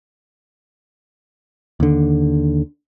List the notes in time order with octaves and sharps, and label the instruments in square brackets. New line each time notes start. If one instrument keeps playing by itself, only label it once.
[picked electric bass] D#2 D3